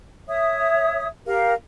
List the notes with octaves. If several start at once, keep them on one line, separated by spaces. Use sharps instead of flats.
C#5 E5 D#6
G4 A#4 F5